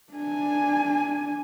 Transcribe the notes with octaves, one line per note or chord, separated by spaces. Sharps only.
D4 G#5